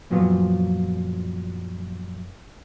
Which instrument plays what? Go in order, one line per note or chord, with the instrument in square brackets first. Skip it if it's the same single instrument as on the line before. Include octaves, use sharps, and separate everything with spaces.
[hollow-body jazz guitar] F#2 A#2 F3 F#3 B3 F4